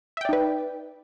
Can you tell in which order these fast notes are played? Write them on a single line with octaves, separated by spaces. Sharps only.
E5 G5 D5 D#4 B4